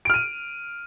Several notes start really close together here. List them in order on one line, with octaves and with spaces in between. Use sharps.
D7 F6 D#7